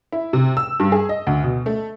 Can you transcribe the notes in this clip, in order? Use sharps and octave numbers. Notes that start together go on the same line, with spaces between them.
E4
C3
E6
G2
G#4
D#5
D2
B2
A3